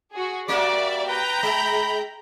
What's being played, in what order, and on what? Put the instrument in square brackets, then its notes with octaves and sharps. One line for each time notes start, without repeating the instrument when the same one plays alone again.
[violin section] F#4 G#4
[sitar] G3 A#3 F#4 [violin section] D5 E5 [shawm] D6
[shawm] B4 [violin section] G5 A#5 G6
[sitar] G#3 [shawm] B5